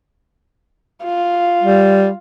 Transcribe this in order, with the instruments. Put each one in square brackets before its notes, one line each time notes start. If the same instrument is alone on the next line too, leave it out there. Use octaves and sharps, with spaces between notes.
[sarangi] F4
[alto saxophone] G3